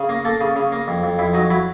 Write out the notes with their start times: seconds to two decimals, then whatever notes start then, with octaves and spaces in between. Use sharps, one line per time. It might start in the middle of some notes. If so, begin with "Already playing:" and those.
Already playing: C#3
0.09 A#3
0.25 A#3 A4
0.41 C#3
0.56 C#3
0.72 A#3
0.88 F2
1.03 F2
1.19 F2 E4
1.34 F#3 D#4
1.50 F#3 E4